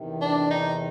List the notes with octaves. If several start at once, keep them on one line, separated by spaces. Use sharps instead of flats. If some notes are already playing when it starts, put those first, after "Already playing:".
Already playing: E2 C3 D#3
D4
D#4